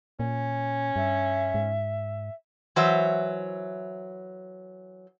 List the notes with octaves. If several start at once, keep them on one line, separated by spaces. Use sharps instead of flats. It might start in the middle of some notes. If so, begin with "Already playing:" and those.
A#2 C#4
G2 E5
G#2
E3 F#3 C5 E5